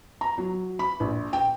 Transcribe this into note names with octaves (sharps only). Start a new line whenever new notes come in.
A#5
F#3
B5
A#1
G5